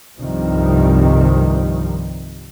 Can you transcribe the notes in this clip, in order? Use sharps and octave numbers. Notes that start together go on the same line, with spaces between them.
C2 G2 C3 D#3 F3 G3